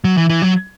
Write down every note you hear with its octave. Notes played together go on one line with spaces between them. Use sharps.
F#3
E3
E3
F#3